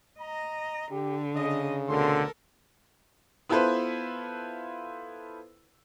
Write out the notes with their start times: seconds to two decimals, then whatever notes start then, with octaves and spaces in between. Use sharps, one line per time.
0.20 D#5 A#5
0.92 D3 G4
1.36 C#3 D#5
1.89 D2 B2 D3 C4 A4 A#4 C6
3.49 B3 E4 F4 A4 B4 C5